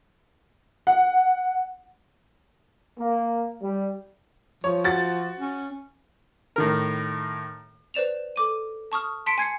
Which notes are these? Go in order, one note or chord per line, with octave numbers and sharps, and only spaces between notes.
F#5
A#3
G3
F3 C#5
F#4 A6
C#4
A2 D#3 A#4
B4 C5 D5 E7 F7
A4 D6 D#7
A5 C#6 D#6 F6
A5 C6 B6 C#7 D7
G#5 G#6 C7 C#7